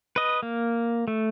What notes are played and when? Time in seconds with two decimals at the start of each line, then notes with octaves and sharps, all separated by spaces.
0.16 B4 D#5
0.43 A#3
1.08 A3